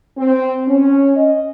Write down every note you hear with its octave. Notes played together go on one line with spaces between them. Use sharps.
C4
C#4
D#5